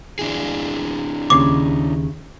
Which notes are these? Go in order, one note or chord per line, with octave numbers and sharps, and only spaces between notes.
D4 E4 G#4
D#2 C#3 C6 D6